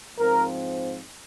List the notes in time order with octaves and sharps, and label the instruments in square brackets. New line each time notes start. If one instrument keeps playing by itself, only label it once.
[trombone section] G#2 F3 C4 A#4